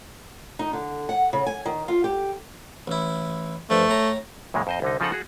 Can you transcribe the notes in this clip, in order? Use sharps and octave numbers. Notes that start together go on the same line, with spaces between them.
D#4
D3
F#5
C#3
G#5
D#3
F4
G4
A1 E4
G2 F3 A3
A2 A#5
F#2 A#2 C#3 G#3
F2 C5 D#5
C2 D3 D#4
C#3 F3 D#4 F4 A4 F#5
F#4 G#4